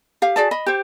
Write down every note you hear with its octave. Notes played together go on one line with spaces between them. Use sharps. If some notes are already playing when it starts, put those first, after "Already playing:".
G4 F5
F#4 G#4 D5 A5
D#5 B5
G4 C5